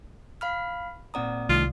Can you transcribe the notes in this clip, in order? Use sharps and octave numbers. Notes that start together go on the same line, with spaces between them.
F5 B5 F6
A#2 C4 D5 F#5 A#5 D#6
C2 D#3 A3 F4